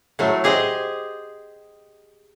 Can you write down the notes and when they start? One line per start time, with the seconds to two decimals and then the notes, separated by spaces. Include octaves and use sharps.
0.19 A2 F#3 A3
0.44 G4 G#4 C5 D#5